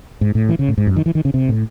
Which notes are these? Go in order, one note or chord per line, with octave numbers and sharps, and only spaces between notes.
G#2
A2
E3
C#3
A2
G#2
F#2
D#3
E3
D#3
C#3
C3
A2